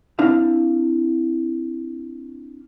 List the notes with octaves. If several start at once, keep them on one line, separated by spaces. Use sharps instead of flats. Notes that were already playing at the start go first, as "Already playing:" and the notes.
C4 D4 E4 F5